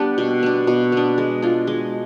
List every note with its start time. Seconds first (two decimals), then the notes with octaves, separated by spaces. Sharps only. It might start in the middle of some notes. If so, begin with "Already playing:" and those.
Already playing: G3 B3 D4 G4
0.18 B2
0.43 B3 D4
0.67 B2
0.92 B3 D4
1.18 G#3
1.42 D4 F4
1.67 G#3